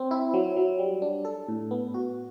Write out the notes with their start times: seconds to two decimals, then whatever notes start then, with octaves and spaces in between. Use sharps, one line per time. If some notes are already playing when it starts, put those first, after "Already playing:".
Already playing: C4
0.11 E4
0.34 F#3
0.57 F#3
0.79 G3
1.02 D4
1.25 A4
1.48 A2
1.71 B3
1.94 F#4